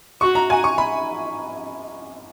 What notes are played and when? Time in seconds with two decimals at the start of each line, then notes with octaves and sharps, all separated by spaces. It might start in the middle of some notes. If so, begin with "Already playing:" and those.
0.21 F#4 C#6
0.35 A#5
0.50 G#5
0.64 C#6
0.78 B5